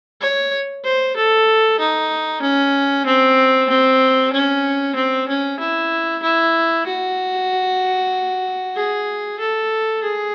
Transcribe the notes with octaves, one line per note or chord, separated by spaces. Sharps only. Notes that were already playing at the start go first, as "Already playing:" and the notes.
C#5
C5
A4
D#4
C#4
C4
C4
C#4
C4
C#4
E4
E4
F#4
G#4
A4
G#4